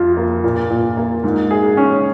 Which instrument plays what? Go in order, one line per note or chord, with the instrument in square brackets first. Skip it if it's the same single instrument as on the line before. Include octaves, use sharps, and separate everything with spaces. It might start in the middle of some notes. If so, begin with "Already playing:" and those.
Already playing: [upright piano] F2 F4
A#3
A#2
A#2
A#3
G#2
G#4
C#4